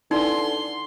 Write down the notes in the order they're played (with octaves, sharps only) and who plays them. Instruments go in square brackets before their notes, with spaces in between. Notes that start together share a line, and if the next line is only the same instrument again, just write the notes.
[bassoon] D3 [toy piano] D#4 [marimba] E4 B4 G#5 [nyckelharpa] C6